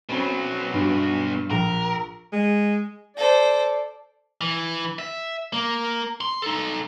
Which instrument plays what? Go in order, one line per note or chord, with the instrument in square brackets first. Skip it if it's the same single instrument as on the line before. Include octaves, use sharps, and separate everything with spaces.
[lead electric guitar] B2 F#3 [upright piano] C4 C#4 B5
[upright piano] G2
[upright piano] A#1 [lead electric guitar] A#4
[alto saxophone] G#3
[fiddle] A4 C5 [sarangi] D5
[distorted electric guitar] E3
E5
A#3
C6
D#4 A4